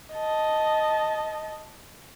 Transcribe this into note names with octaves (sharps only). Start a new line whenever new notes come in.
D#5 A5